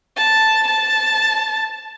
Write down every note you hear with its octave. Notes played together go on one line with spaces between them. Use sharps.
A5
A5